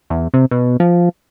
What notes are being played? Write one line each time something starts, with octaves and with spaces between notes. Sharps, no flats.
E2
C3
B2
F3